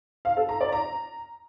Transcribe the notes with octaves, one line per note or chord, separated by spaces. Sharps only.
F5
A4
A#5
D5
A#5